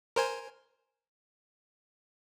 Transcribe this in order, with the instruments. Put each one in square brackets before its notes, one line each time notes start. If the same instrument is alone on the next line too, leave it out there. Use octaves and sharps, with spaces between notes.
[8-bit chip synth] A#4 C5 G#5